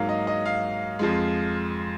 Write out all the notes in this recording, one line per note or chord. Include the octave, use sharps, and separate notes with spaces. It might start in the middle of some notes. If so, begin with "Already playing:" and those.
Already playing: G#2 F#3 A#3 F5
D#5
D#5
F5
F2 F3 G#3